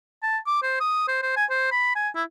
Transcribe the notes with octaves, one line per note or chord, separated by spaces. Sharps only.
A5
D6
C5
D#6
C5
C5
G#5
C5
B5
G#5
E4